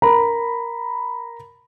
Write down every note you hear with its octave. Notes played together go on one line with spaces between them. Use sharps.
A#4 A#5 B5